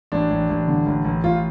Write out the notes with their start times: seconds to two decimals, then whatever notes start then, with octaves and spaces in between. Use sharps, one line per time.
0.12 A1 D4
0.30 A1
0.49 A1
0.68 D3
0.86 A1
1.05 A1
1.23 A1 F4